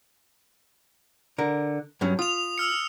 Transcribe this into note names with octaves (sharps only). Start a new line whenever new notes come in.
D3 A#4
G2 F#3 C#4
F4 D#6 F7
E6 F6 C#7